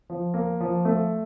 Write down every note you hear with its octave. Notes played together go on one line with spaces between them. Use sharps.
F3
A#3
F3
A3